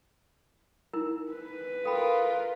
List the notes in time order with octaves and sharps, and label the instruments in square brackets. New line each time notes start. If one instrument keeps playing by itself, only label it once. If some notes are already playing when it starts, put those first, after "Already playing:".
[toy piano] D#4 E4 A#4
[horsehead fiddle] B4
[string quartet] F4 A#4 [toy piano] A4 G5 B5